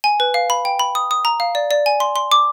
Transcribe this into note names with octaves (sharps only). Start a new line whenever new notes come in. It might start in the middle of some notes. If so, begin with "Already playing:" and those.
G#5
B4
F5
B5
G5
B5
D#6
D#6
A#5
F5
D5
D5
G#5
C6
C6
D6